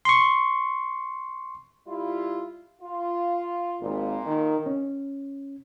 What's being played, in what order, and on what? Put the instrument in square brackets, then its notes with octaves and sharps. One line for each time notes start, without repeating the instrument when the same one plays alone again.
[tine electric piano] C6 C#6
[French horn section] G3 E4 F4
F4
[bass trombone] G#1 [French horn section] A#2
[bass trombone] D#3
[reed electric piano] C#4